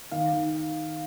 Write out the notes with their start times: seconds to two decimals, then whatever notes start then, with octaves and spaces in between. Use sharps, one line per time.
0.11 D#3 F5
0.33 D#3